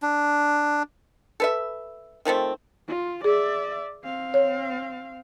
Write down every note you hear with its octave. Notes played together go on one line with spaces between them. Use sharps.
D4
A4 B4 E5
D#3 F3 A3 C4
F4
G#4 D5 E5
C4 F5
C#5